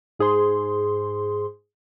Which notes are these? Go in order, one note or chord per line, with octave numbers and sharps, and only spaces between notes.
G#2 G#4 C5 C6